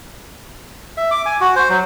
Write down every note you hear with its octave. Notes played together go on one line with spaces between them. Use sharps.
E5
D6
G#5
F#4
C5
F#3